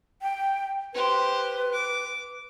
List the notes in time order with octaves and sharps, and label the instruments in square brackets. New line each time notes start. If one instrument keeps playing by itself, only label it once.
[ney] G5
[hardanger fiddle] G4 C5 [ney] B4
[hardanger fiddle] D6